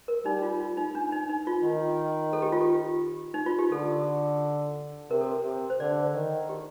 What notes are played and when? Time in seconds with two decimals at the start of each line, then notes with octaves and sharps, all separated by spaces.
0.08 A#4
0.25 G3 D#4
0.42 F4
0.61 F4
0.77 D#4
0.95 D4
1.12 D#4
1.29 D#4
1.47 F4
1.63 D#3
2.33 A4
2.42 G4
2.52 F4
2.61 G4
3.34 D#4
3.46 F4
3.59 G4
3.72 D3 A4
5.11 C3 A#4
5.21 A4
5.31 A#4
5.45 C3
5.70 C5
5.80 D3 D5
6.14 D#3
6.49 G4